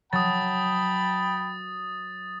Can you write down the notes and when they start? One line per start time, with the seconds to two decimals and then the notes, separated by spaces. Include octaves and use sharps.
0.13 F#3 G5 A5 B5 D#6 A6